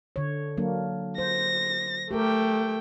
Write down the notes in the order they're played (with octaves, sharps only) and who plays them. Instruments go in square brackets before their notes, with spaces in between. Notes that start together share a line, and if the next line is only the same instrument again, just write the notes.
[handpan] D3 C#5
F#3 A#3 D4
[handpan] C5 [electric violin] A#6
[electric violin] A3 G5 [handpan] G4 A#4